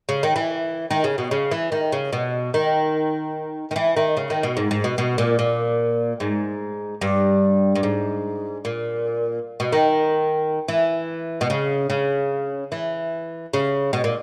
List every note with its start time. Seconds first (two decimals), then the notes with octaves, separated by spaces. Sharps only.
0.09 C#3
0.23 D#3
0.36 E3
0.91 D#3
1.04 C#3
1.18 B2
1.31 C#3
1.51 E3
1.72 D#3
1.92 C#3
2.13 B2
2.54 D#3
3.71 D#3
3.76 E3
3.97 D#3
4.17 C#3
4.30 D#3
4.43 B2
4.57 G#2
4.71 G#2
4.84 B2
4.98 B2
5.18 A#2
5.39 A#2
6.20 G#2
7.01 G2
7.75 G2
7.83 G#2
8.65 A#2
9.60 B2
9.72 D#3
10.68 E3
11.41 B2
11.50 C#3
11.90 C#3
12.72 E3
13.53 C#3
13.93 B2
14.04 A#2